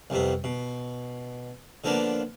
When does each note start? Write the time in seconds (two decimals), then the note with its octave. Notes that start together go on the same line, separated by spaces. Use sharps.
0.10 C2 F2 C3 B3
0.44 B2
1.84 D3 F3 A#3 B3 D4